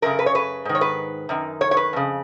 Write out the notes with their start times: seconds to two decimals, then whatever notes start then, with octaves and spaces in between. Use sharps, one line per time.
0.02 F#2 C#3 A#4
0.19 B4
0.26 C#5
0.35 B4
0.65 G#2 D#3
0.75 C#5
0.81 B4
1.29 F#2 D#3
1.61 C#5
1.71 C#5
1.77 B4
1.93 F2 C#3